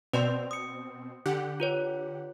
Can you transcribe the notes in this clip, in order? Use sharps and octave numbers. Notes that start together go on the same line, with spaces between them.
B2 C4 B4 D5 C6
D#6 C#7
D3 G4 F#5
F4 B4 C#5